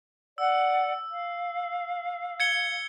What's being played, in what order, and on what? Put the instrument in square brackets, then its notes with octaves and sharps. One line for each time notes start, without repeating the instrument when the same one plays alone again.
[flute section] D5 F#5 [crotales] E6
[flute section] F5
[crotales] G#6 C#7 G7